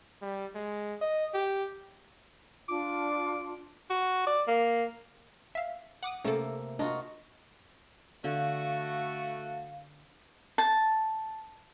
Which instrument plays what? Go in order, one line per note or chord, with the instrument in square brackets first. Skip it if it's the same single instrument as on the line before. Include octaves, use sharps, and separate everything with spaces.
[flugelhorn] G3
G#3
D#5
G4
[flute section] D4 F4 [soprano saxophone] D6
[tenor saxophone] F#4
D5
A#3
[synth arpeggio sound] E5 F5
F#5 D6 D#6
[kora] C3 A3 A#3 [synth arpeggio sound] C#4 A4
[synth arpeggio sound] D4 [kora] D#4 F4 F#4
[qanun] D3 [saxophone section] A3 F#4 [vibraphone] F5
[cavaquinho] A5